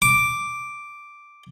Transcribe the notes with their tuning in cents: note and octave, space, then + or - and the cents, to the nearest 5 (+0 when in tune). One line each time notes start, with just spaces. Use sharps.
D6 +0